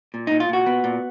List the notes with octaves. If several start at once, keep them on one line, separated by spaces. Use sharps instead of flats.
A#2
A#2 D#4
F4
A#2 F#4
B3
A#2